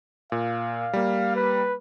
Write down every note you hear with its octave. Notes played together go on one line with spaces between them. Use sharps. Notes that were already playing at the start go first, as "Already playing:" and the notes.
A#2 F5
G3 A#3
B4